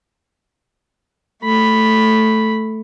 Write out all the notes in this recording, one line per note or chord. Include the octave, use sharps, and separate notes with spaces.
A3 B5